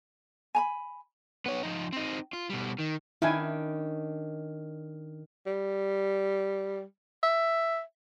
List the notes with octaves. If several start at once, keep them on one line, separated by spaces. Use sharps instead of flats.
G#5 A#5 B5
B3 C#5
F3 D#4
C4 D#4
F4
B2 G3
D#3
D#3 C#4 D4 E4 G#5
G3
E5